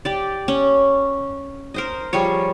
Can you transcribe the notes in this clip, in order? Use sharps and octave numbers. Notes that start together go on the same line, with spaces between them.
G4 D5
C#4
A#4 C5 D#5
F3 G3 G#4 C#5